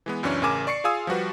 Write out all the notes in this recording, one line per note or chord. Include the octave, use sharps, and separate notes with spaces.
E3 G#3 B3
C#2 F#2 E3 C#4 D4 C#5
A1 C#3 A#4 G#5 D6 E7
D5 C#6 C7 C#7
F4 G#4 F5 G#5 D#6 E6
F3 G3 F#4 B4